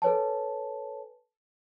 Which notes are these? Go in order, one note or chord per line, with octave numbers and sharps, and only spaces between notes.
A4 B4 C#5 G#5 A5